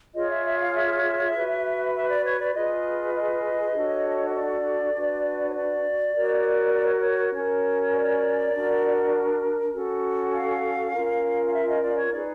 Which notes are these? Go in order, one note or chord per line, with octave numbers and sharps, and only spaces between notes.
F4 G#4 C#5 D#5
E5
E5
F5
E5
F#4 B4
E5
D5
C#5
D5
F4 G#4 B4 D#5
D#5
D4 F#4 A4 C#5
C#5
D5
D4 F#4 B4
C#5
D5
F#4 A#4 C#5
D5
C#5
C#5
C#4 F#4 A#4 C#5
D5
D4 F#4 A#4
C#4 F#4 A4
F5
C#4 F4 A#4
F5
E5
D#5
D5
C#5
D#4 G#4 B4 D5